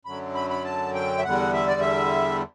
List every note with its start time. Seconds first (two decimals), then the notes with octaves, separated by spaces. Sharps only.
0.05 F#2 D3 F#3 B5
0.35 B5
0.50 B5
0.64 A5
0.95 G5
1.18 E5
1.24 E2 D3 G3 F#5
1.54 E5
1.67 D5
1.81 E5